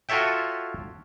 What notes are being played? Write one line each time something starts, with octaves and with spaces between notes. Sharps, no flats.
F4 F#4 A4 C#5 E5 G5